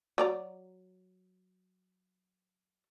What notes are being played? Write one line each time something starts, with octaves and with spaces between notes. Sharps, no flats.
F#3 D5 A#5